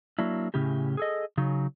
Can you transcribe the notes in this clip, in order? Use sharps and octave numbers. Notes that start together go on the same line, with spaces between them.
F#3 A#3 D4 E4
A2 C#3 C#4 E4 G4
G#4 A4 D#5
C#3 F#3 D#4